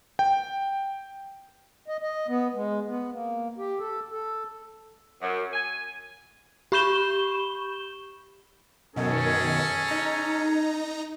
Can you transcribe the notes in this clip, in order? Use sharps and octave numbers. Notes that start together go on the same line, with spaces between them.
G5
D#5
D#5
B3
G#3
B3
A#3
G4
A4
A4
F#2
G#5
G4 B5 C#6 G6 E7 G7
F#2 B2 D#3 C#4 G#4 A4
D#4 A#5